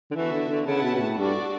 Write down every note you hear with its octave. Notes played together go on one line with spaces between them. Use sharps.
D3
E3 B3 F#4 A4 E5
D3
D3
C#3 C#4 E4 B4 F#5 A5
B2
B2
A2
G2 D4 F#4 A4 D5